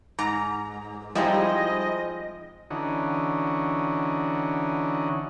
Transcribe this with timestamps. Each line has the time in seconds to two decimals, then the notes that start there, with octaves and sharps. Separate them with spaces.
0.19 G#2 A#5
1.15 F3 G3 G#3 C4 D#4 E4 D#5
2.70 D3 E3 C#4 D#4 F#4